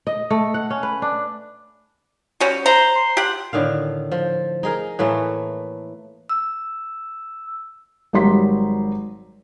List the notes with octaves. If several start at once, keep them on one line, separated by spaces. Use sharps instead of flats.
D#5
A3
F#5
C#4
B4
D4
G3 C#4 F#4
C5 A#5
C6
G4 F#5
A2 D3 D#3 F5
F3
D#4 G#4 A#4
A2 E3 A3 A#3
E6
G#1 F#3 G3 A#5 C6 B6